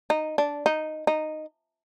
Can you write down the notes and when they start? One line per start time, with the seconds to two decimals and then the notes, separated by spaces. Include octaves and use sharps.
0.10 D#4
0.38 D4
0.66 D#4
1.07 D#4